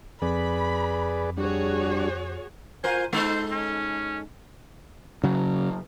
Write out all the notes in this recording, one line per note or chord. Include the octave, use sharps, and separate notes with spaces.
F2 G#4 B4 D5 B5
G3 D4 F#4 G#4 C#5
F4 A#4 C5 G#5
G#3 D#4 A4 C5
C#4
C#3 F#3